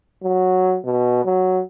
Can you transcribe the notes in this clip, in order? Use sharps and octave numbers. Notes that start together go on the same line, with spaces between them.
F#3
B2
F#3